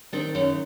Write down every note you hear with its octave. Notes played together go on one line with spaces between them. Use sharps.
D#3 C4 D4
F#2 C#4 D#4